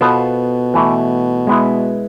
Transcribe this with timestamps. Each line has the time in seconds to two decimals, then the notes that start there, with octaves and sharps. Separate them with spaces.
0.01 B2 B3 F4 A4 C5
0.74 E3 A3 E4
1.47 G#3 B3 E4